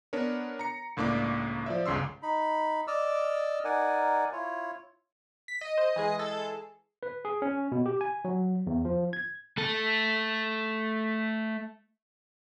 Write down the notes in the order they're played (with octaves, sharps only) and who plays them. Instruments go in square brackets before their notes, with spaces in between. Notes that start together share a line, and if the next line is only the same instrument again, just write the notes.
[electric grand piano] B3 D4 A#4 B4 C#5
A#5 C#7
C#2 A2 A#3 D4 D6
F3 D5 E5
G1 C#2 C#3 C6 E6
[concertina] D#4 B5
D5 D#5 D6 E6 F6
D#4 A#4 D5 F#5 G#5
E4 F4 C#5
[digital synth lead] B6
D#5
[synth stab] C5
E3 G#3 G#4
[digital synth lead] A4
[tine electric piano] B4
G#4
C#4
B2
G4
G#5
F#3
E2
F3
G#6
[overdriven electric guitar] A3 A4